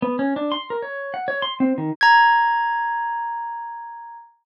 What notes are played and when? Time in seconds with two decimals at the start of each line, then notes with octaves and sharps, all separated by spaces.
0.02 B3
0.19 C#4
0.36 D4
0.52 C6
0.70 A#4
0.82 C#5
1.14 F#5
1.28 C#5
1.42 C6
1.60 C4
1.78 D#3
2.01 A#5 G#6